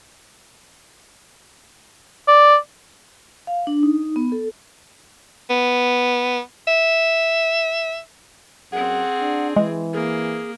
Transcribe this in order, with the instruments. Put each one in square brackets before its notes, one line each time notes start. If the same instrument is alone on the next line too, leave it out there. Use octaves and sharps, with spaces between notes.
[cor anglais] D5
[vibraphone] F5
D4
D#4
B3
A4
[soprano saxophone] B3
E5
[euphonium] F#2 [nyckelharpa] C4 G#4 [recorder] F#5
[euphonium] D4
[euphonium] E3 [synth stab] G#3
[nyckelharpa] A#3 [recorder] G#4